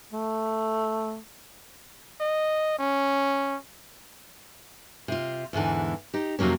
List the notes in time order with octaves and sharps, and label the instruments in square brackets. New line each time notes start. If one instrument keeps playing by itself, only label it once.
[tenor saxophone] A3
[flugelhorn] D#5
C#4
[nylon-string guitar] C3 F4
E2 G#2 D3 E3
D#4 G4
F2 C3 F#3 A#3 C#4